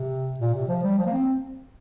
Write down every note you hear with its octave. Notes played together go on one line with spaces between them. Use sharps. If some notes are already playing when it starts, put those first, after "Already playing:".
Already playing: C3
A#2
C3
F3
G3
F3
A#3
C4